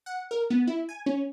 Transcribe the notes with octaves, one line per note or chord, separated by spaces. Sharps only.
F#5
A#4
B3
E4
G#5
C#4